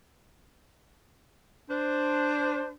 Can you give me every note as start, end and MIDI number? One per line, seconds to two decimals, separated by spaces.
1.69 2.73 62
1.69 2.73 72